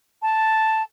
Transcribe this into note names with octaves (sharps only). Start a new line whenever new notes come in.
A5